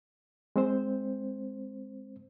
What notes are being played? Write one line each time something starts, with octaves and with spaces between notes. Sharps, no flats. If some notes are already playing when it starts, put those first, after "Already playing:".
G#3 C4 C5